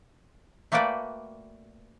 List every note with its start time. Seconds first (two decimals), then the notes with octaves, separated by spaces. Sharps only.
0.72 A3 A#3 F#4 B4 D5 G5